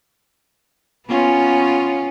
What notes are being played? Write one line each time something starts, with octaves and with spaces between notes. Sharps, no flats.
B3 C#4 F4